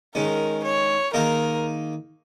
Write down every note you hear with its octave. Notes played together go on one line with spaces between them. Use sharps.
D#3 G#3 C#4 A#4
C#5
D#3 A#3 D#4 G#4 A#4